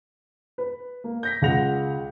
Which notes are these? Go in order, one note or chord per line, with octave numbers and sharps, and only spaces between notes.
B4
A#3
G6 A#6 B6
C#2 G#3 F#5 A#6 F7